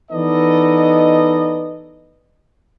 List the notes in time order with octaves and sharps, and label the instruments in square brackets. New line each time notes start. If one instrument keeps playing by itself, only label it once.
[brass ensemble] E3 B3 D#4 A4 D5 D#5